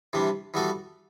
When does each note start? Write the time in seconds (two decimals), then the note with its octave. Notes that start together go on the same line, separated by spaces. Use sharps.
0.13 C3 E3 G3 D4
0.54 E3 G3 B3 F#4 A4